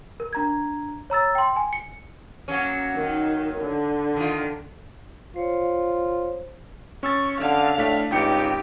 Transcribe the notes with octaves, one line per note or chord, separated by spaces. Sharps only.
A#4
D4 A#5 G#6
C#5 A#5 E6 A6
G5 C6
G#5
C#7
F#3 A#3 C#4
D#3 D#4
D3
D#3 F4
F4 C5 C#5
C#4 C#6 E6 A6
D3 F5
A2 A3 D4 B6
G#1 C#2 D#4 G4 G5 C#7